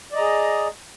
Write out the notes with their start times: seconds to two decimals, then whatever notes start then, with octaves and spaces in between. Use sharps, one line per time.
0.12 D5
0.15 D#5
0.17 A#5
0.20 G#4